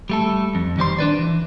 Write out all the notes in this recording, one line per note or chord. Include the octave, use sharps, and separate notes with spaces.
G3 A3 A4
F2
D#3 G3 C5 C6
D4 B4 D5
E3